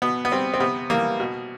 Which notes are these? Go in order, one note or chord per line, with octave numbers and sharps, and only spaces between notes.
B2 B3
B3
G3 C4
C4
C3 B3
E3 G3 A#3
B2